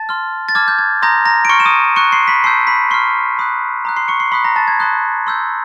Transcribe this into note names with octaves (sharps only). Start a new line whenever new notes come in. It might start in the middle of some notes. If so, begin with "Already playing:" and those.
Already playing: A5 A6
C6 F6
A6
A5 D6 F6 G#6
G6
G#6
A#5 C6 D#6 G6 A#6
A#5 A#6
D7
C6 C#6 F6 C#7
E7
D#6 D#7
C#6 F#6 C#7
C6 C7
B5 B6
A5 C6 E6 G6 C7
B5 B6
C6 C#6 F6 C7
B5 D#6 F#6
A#5 D#6 F#6
C6 C7
C#6 C#7
C6 C7
B5 C6 D#6 F#6 B6
A#5 A#6
A5 A6
G#6
A5 C6 D#6 F#6
C6 E6 G6